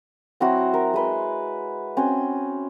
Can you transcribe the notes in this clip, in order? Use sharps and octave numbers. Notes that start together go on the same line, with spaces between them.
F#3 C4 E4 F#4
A#4
G#3 B4 C6
C4 C#4 F#4 G#5